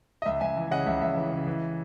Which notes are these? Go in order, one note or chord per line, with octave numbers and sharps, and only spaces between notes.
D#5
C#2 E5
C#2 E5 G#5
E3
C#3 D#5 F#5
C#2 E5
C#2 E5
E3
C#3
E3